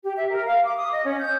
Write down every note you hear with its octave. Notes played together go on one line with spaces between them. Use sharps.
G4
E5
A#4
F5
D6
D#6
D#5
C#4
G6